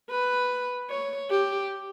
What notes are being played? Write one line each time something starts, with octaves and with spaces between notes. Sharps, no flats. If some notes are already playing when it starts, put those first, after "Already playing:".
B4
C#5
G4